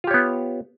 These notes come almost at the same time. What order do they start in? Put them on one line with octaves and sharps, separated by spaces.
F4 G4 C#5 B3